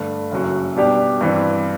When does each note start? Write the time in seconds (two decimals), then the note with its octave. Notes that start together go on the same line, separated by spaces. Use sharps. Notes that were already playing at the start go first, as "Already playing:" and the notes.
Already playing: G2 D3 A3
0.32 F#1 F#2 F#3
0.77 B2 G3 D4 G4
1.21 G2 E3 G3 C4